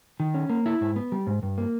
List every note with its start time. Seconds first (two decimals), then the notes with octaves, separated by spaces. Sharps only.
0.20 D#3
0.34 C#4
0.50 A#3
0.66 E4
0.81 G#2
0.96 B3
1.12 G3
1.27 G#2
1.43 G2
1.58 A#3